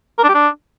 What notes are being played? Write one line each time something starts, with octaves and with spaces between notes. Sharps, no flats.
A#4
D4
G4
D4